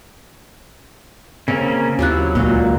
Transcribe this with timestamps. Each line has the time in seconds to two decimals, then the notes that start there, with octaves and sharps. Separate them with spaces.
1.48 C#3 A#3 C4 C#4
1.99 D#2 F#3 E4 F4 G4 F#6
2.35 C#2 A#2 D#4 F#4